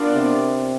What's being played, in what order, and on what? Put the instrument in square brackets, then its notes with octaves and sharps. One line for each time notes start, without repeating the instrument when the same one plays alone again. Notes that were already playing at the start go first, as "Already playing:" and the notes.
Already playing: [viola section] B3 D4 F4 A#4 D5
[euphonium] C3